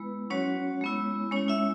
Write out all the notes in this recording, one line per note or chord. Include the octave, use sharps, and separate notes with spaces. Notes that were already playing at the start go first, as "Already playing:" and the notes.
Already playing: G#3 B3 E4 B4
F#3 C#4 F#4 C#5
G#3 B3 E4
G#3 C#4 E4 C#5
E4 E5